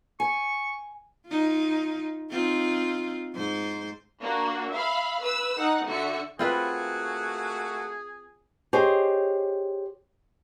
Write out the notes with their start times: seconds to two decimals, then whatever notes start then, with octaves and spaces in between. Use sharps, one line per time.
0.20 G#5 C#6
1.28 D#4 F4
2.30 C4 D#4 F4
3.34 G#2 C5
4.22 A#3 D4 F#4
4.72 E5 F5 B5
5.23 B4 E6
5.57 D#4 F#5
5.87 D3 F#4 E5 C#7
6.39 A3 A#3 C4 F4 F#4 G#4 B4
8.73 G4 G#4 C5 C#5 D#5